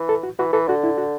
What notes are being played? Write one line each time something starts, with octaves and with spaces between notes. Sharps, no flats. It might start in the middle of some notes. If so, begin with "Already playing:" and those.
Already playing: E3
A4
F#4
E3 F#4
E3 A4
D3 F#4
E4
F#4